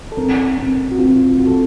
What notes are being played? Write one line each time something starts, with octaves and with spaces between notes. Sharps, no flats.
A4
C4 A#4
C4
F#4
C4 F4
F4 F#4
A4